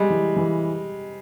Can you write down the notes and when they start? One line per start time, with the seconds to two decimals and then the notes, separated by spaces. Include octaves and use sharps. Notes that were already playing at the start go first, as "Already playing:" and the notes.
Already playing: G3 G#3
0.10 E3
0.36 E3